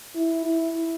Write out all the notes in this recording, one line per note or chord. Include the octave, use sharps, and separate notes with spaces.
E4
E4